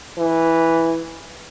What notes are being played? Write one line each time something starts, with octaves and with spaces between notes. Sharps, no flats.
E3